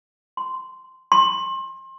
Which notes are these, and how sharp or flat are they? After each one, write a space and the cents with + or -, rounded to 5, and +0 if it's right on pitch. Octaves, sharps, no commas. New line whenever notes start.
C6 -10
C6 +30